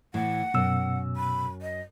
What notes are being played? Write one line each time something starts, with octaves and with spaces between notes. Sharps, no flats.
A2 E3 F#5
F#2 B2 E6
B5
D#5